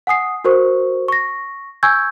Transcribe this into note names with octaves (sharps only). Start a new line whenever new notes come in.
F#5 G#5 D#6 C7
F#4 A#4 C5 C#6
C#6 A#6
G#5 C#6 E6 G6 G#6